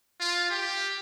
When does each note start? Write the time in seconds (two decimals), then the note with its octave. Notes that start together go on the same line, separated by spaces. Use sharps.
0.20 F4
0.50 G4